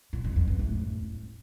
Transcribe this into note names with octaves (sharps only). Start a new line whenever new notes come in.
A#2
F2
F2
E2
A2